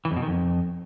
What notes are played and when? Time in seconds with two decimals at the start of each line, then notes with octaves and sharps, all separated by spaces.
0.05 E3
0.11 F2
0.16 B2
0.22 D#3
0.28 F2